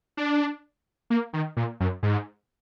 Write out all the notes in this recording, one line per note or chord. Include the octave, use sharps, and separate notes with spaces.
D4
A#3
D#3
A#2
F#2
G#2